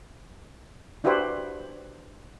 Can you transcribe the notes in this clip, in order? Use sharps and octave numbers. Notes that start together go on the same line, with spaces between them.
D4 E4 F#4 G4 B4 C5